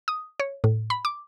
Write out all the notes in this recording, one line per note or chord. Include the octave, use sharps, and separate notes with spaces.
D#6
C#5
A2
B5
D6